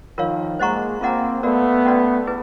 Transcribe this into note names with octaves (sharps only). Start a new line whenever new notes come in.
D#3 F3 F4 A#4 C#5 F5
G#3 A#3 C5 D#5 F#5 A#5 C#6
A#3 C4 F4 A#4 D#5 F#5 A#5
A3 B3 F#4 A#4 D5 F5
C#4 F#4 B4 D5
E4 G#4 B4